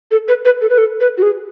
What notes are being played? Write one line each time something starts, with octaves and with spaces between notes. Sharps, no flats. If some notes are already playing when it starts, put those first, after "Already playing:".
A4
B4
B4
A4
B4
A4
B4
F#4
G#4